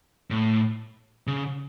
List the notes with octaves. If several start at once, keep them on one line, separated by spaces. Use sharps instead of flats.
A2
C#3